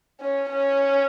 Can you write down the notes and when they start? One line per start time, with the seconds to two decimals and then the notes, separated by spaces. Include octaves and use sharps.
0.20 C#4
0.49 C#4